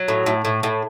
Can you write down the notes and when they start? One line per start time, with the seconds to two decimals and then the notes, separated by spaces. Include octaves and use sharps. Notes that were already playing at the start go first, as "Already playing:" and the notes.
Already playing: F#3
0.08 A2
0.26 A2
0.45 A2
0.63 A2